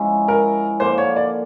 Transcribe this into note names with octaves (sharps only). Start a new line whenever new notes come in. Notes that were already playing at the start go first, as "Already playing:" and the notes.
Already playing: F3 G#3 C#4 E4
A#4
D3 F3 A#3 C5
C#5
D5